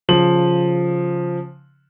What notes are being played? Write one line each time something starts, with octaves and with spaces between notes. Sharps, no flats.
C#3 F3 F#7